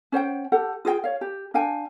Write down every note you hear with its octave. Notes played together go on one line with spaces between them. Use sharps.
C#4 C5 F#5 G5
G4 A4 F#5
F4 G#4 A4 G5
C#5 F5
G4
D4 F5 G5 G#5